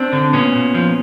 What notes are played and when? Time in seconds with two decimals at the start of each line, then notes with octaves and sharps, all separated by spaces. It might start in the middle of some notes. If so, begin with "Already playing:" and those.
Already playing: C4 D4
0.13 D3
0.33 A#2 B3 C#4
0.54 A#2
0.74 F3